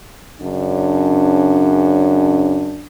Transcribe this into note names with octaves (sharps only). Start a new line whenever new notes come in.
F#2 C#3 D4